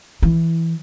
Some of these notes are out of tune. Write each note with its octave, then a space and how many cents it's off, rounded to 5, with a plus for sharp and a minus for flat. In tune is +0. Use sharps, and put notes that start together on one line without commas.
E3 +0 E4 +10